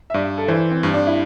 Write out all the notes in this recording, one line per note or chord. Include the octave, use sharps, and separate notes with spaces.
E5
G2 D5
A4
E3 C5
C4
G2
D4
E4